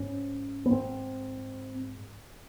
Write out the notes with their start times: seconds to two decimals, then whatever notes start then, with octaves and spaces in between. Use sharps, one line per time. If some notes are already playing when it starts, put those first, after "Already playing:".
Already playing: G#2 C#4
0.66 B3
0.71 G#2 C4